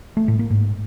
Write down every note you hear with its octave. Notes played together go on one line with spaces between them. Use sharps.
A3
A2
A#3
G#2